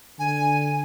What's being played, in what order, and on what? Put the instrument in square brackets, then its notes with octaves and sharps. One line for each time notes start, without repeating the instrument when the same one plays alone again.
[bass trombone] D3 [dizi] G#5